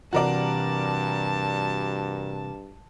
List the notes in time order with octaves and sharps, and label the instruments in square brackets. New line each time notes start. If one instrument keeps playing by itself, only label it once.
[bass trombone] G2 [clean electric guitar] C3 E3 F#5 [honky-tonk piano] F#4 A#4 D5 [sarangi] A5